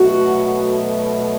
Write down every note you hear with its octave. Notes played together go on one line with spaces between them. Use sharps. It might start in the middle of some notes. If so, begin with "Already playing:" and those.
Already playing: B2 F#3 A3 F#4